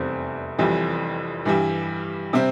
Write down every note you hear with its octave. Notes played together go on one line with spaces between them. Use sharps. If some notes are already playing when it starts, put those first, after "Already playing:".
Already playing: F1 E2 C3 G3 C4
F1 F2 E3 G3
G2 E3 G3
C3 G3 C4